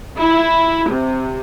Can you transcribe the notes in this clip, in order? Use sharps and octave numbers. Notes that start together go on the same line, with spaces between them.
E4
C3